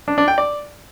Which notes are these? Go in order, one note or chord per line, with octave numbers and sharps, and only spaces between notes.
D4
D4
G5
D5